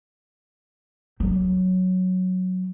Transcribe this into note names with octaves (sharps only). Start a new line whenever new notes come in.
F#3